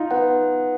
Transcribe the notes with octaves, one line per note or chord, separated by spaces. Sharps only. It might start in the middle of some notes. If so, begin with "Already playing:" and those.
Already playing: D#4 F4
B3 F#5